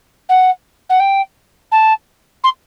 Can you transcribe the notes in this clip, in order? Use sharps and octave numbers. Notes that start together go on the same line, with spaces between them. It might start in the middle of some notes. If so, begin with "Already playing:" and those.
F#5
F#5
G5
A5
C6